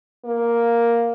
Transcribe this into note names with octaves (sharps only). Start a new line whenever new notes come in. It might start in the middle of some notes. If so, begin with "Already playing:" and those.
A#3